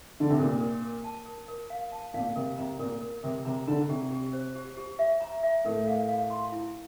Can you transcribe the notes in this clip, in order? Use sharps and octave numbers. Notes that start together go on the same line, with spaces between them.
D3
C3
A#2 A#4
A#4
A#4
A5
A#4
A#4
F5
A5
A#2 F5
C3 A#4
C3 A#5
A#2 A#4
A#4
C3 A#4
C3 A#5
D3 A#5
C3 G4
G4
C5
G4
G4
E5
A#5
E5
A2 A#4
F5
F5
C6
E4